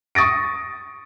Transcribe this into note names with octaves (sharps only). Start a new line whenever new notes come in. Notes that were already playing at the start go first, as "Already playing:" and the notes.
C#6 D#6 A6 A#6 D7